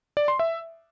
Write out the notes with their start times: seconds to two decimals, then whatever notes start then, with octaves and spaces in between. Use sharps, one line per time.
0.17 D5
0.28 C6
0.39 E5